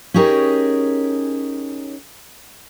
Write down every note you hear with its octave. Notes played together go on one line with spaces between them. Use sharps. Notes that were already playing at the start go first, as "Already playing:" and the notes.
C#4 D#4 G4 G#4 A#4 C#5